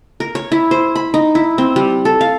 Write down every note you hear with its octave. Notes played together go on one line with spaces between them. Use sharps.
A#4
C#5
E4
C5
B5
D#4
E4
C4
G3
A4
F5